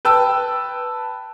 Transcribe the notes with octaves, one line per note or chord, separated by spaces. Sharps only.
B4 G5 A5 E6